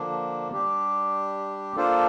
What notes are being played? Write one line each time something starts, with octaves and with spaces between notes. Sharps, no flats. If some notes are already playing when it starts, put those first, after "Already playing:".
Already playing: D3 F3 A#3 D4
G3 D4 G4
A#3 D4 F4 A4 C5